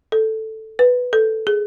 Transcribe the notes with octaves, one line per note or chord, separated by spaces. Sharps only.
A4
B4
A4
G#4